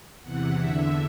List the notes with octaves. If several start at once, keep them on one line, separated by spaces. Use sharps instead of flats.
E2 C3 E3 F#5
E2 D3 E5